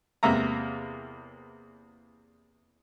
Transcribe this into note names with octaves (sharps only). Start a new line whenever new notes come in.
E2 C3 A#3 E5 A#5